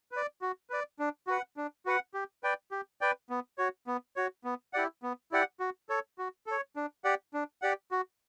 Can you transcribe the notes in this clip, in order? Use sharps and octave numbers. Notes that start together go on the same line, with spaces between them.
B4 D5
F#4
B4 D5
D4
F#4 B4 F#5
D4
F#4 B4 F#5
G4
B4 D5 G5
G4
B4 D5 G5
B3
F#4 C#5
B3
F#4 C#5
B3
E4 G4 D5 F#5
B3
E4 G4 D5 F#5
F#4
A4 C#5
F#4
A4 C#5
D4
G4 D5 F#5
D4
G4 D5 F#5
F#4